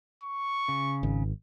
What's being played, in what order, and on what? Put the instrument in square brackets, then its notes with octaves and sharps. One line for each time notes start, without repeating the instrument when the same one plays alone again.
[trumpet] C#6
[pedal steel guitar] C#3
[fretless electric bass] G#1